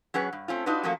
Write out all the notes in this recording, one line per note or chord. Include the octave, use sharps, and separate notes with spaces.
F#3 C#4 G#4 B4 F#5
G2
A3 C4 C#4 F4
D4 D#4 F4 F#4 B4
F3 A3 A#3 C#4 F#4